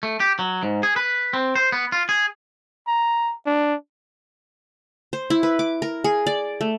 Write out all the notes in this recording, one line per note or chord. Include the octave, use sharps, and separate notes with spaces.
A3
G4
F#3
G#2
G#4
B4
C4
C5
B3
F4
G#4
A#5
D4
C5
E4
B4
D6
A#4
G#4
D5
A3